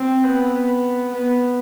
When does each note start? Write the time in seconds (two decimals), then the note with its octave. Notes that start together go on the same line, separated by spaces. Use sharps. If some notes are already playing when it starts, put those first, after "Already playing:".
Already playing: C4
0.24 B3
0.54 B3
1.13 B3